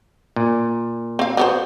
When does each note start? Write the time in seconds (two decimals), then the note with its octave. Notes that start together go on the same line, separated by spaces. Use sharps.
0.36 A#2
1.19 C4 F5
1.37 F#3 B3 C5